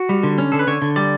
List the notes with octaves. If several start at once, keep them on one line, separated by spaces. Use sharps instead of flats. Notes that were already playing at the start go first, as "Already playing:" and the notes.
Already playing: F#4
G3
D3
C#4
D3 A4
B4
D3 C#5
D3
G3 D5